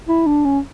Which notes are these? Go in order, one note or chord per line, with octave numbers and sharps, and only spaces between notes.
E4
D4
C#4